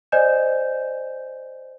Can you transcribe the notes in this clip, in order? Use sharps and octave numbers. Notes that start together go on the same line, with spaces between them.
C5 D5 D#5 G#5 G6 E7